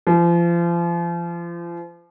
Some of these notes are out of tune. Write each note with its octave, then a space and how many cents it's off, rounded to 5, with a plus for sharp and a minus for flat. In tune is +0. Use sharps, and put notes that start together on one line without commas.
F3 -35